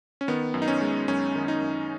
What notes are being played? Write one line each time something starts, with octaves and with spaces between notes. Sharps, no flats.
C#4
D#3 B3
F#2
D#4
C#4
G#3
F#2 C#4
D#3
D#4
F#2